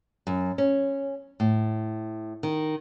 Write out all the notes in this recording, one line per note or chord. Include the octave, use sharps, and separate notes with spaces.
F#2
C#4
A2
D#3